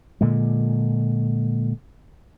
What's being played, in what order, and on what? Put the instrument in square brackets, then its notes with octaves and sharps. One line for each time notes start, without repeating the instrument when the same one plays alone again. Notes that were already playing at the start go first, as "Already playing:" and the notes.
[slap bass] A#2 D3 G#3